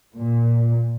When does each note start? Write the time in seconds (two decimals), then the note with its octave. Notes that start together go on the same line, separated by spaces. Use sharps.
0.15 A#2